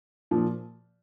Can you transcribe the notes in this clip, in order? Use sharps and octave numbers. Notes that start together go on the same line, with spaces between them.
A#2 F3